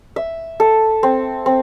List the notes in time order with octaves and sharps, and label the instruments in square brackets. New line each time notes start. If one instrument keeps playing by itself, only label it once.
[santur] E5
A4
C4
C4